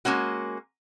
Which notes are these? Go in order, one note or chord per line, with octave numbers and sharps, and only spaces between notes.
G#3 A#3 C#4 F#4